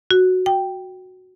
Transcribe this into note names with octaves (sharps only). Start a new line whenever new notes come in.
F#4
G5